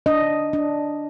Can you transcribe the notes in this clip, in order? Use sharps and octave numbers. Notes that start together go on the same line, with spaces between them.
D4 D#5
D4